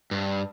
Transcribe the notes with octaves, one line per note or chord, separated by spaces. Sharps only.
G2